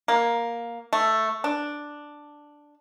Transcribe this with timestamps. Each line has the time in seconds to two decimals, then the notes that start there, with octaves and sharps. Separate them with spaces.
0.08 A#3
0.93 A3
1.44 D4